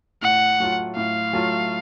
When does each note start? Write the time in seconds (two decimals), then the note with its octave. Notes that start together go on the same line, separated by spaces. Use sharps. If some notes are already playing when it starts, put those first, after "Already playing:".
0.22 A2 F#5
0.60 F#3 A3 F4
0.96 A2 F5
1.33 F#3 A3 F4